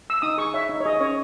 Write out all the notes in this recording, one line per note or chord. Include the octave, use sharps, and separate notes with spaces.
E6
D#4 D#6
G#4 C#6
C#5 E5
D#4
C#5
G#4 D#5
C#4 C#5